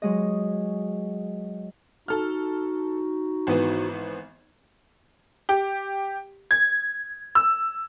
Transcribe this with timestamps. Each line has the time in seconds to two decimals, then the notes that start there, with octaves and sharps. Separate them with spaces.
0.02 F#3 G#3 D#5
2.08 D#4 F#4 A4 F6
3.47 G#1 E3 B3
5.49 G4
6.51 G#6
7.35 E6